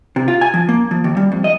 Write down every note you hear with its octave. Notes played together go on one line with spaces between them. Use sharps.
C3
F4
G#5
F3
A#3
F3
D#2
G3
F2
D#5